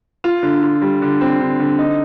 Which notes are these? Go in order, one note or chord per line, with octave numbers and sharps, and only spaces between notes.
F4
D3
F4
G3
D3
C4
D3
D3
D#4